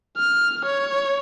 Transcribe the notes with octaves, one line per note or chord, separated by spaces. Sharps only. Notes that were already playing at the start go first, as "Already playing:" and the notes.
F6
C#5